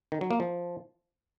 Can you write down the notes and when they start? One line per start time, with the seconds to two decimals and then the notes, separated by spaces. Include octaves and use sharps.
0.12 D#3
0.21 F#3
0.31 A#3
0.40 F3